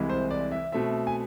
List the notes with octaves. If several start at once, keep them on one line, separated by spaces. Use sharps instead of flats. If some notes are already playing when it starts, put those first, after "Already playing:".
Already playing: C2 C3 E3 G#3
C5
D5
E5
B2 A3 C4 E5
G#5